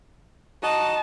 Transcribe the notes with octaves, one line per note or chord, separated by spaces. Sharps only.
D#4 F#4 D#5 A5